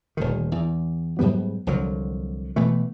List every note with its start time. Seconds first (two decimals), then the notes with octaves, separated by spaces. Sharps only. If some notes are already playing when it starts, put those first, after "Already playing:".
0.17 D#1 D2 D#3
0.52 E2
1.19 G#2 F#3 G3 B3
1.67 C2 D3 F3 F#3
2.56 B2 E3 A3